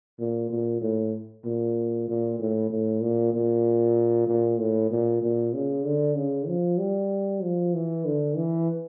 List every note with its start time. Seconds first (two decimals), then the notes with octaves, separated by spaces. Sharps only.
0.19 A#2
0.50 A#2
0.81 A2
1.44 A#2
2.08 A#2
2.39 A2
2.70 A2
3.01 A#2
3.34 A#2
4.27 A#2
4.59 A2
4.91 A#2
5.22 A#2
5.54 C#3
5.85 D3
6.16 C#3
6.47 F3
6.79 G3
7.42 F3
7.74 E3
8.05 D3
8.36 E3